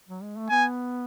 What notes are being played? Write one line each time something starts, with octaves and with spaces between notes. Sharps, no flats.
F#3
G#3
A3
B3 G#5